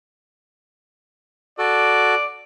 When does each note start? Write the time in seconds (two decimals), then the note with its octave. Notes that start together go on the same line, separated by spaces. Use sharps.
1.59 F#4 A4 D5